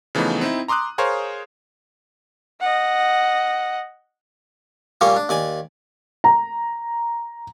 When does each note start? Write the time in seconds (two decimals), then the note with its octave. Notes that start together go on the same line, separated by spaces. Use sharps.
0.15 C#3 E3 F3 A3 B3 D#4
0.41 C4 D#4 E4
0.68 A#5 C6 D6 D#6 F#6
0.98 G#4 A#4 C5 C#5 F5
2.60 D#5 F#5
5.01 A#2 G3 A#3 C#4 C#5
5.16 D4
5.29 D#2 D5 G#5
6.24 A#5